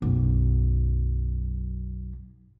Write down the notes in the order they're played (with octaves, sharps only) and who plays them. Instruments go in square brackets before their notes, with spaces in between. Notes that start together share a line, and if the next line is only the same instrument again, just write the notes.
[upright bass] B1 F#2